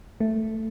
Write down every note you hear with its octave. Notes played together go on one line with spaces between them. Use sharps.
A3